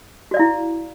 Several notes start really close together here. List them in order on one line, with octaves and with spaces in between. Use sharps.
F#4 D5 F5 E4